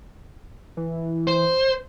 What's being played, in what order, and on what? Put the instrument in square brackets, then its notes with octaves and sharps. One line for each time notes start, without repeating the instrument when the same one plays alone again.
[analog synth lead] E3
[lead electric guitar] C5